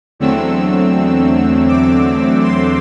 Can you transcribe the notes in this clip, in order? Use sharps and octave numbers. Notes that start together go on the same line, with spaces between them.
E2 D3 F#3 A3 C4 E6
D6
C6